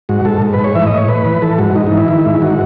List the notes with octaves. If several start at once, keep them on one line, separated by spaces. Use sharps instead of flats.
G#2 F#4
G#2 A4
G#2
B4
G#2
C#5
E3 E5
A2 D#5
C#5
A2 B4
E3
E3 A4
G#2 F#4
G#2 D#4
D#4
E3
E4
D#3
G#2
D#3 F#4